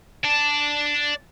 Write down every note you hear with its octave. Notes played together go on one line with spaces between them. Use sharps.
D5 A5